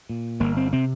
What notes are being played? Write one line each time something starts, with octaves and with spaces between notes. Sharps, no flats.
A#2
G1 A#3
C4
C3 C4